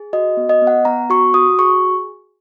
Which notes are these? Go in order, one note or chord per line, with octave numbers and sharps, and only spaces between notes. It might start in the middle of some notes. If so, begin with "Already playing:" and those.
Already playing: G#4
F#4 D#5
B3
D#5
B3
F#5
B3 A#5
F#4 C#6
F#4 D#6
G#4 C#6